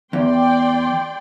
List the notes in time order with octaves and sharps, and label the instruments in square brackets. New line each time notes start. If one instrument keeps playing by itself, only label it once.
[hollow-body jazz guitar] E2 [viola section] D5 G5 C6